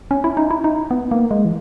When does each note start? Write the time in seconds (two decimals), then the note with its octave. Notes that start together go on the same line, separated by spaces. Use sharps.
0.11 C#4
0.24 E4
0.37 D#4
0.51 E4
0.64 D#4
0.91 B3
1.11 A#3
1.31 G#3
1.45 E3